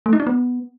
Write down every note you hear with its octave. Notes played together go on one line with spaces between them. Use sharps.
A3
D#4
D4
B3